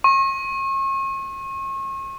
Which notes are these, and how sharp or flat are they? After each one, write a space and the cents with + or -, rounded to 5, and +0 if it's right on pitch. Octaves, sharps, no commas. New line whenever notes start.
C#6 -40